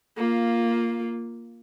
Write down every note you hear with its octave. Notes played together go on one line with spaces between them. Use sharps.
A#3 F4